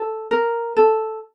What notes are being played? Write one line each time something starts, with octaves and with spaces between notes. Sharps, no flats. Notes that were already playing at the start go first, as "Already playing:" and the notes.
Already playing: A4
A#4
A4